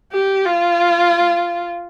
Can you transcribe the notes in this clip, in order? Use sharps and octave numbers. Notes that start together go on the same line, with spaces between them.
G4
F4